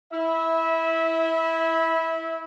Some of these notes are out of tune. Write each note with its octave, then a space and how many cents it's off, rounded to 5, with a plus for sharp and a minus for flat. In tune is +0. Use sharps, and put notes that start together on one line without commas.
E4 -5 E5 -20